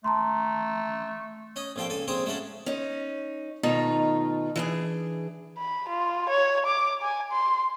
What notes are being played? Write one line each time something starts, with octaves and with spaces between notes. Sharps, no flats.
A3 A5 A#5 C6
C#4 D#5
A#1 F2 F4 A4 G5
C#2 A4 G#5
A#1 C4 G#4 C5 A#5
G#3 A3 C#4 F#4 A4
C#4 D#4
B2 D#3 A3 D#4 F4 A#5
E3 D4 G#4
B5
F4
C#5
D6
G#5
C6